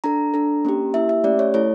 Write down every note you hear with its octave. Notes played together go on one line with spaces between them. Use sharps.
D4 A4 A#5
D4 A4
A#3 C#4 G4
A#3 E4 G4 E5
E5
A3 C#4 G4 D5
C#5
A3 E4 A4 C#5